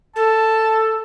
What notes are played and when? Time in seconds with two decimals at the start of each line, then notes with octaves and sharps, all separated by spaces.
0.16 A4 A5